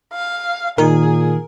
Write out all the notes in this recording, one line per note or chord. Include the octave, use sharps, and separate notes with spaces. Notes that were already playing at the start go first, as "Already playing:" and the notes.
F5
A#2 D#3 G#4 A#4